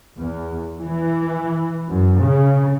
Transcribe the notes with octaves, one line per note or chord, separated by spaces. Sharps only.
E2
E3
F#2
C#3